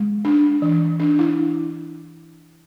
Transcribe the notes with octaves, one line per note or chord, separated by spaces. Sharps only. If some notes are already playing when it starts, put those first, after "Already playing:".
Already playing: G#3
D4
E3
D4
E4